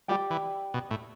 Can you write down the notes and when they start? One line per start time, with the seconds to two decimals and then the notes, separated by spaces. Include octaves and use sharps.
0.08 G3 G4 D5 G5
0.31 E3
0.74 B2
0.91 A2